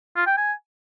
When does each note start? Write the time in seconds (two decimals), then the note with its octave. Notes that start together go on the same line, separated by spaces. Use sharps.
0.16 F4
0.27 G5
0.37 G#5